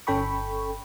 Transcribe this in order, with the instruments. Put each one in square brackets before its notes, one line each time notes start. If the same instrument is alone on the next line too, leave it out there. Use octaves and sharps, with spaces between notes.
[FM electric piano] G1 C#4 A4 G5 B5 C#6